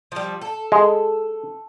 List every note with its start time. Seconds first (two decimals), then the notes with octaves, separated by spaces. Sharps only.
0.12 F3 G3
0.41 A4
0.72 G#3